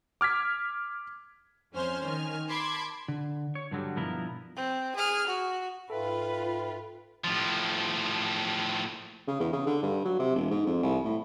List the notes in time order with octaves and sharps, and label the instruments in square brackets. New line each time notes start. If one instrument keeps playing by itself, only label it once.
[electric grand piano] D6 F6 G#6 B6
[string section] F2 C#4 C5 G#5 C6 F6
D#3 G#5 F6
A5 B5 C6 D6 G#6
[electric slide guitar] D3
C#5
G2 D3 F#3 G3
G2 B2 F3 B3 E4 A#4
[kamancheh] C4
G#4 F6
F#4
[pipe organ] G#2 E5 G5 [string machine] F4 [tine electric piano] A4 [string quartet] B4
[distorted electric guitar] A2 F3
[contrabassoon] C#3
E2
C#3
D3
G2
F#3
C3
E1
G#2
F2
C2
A2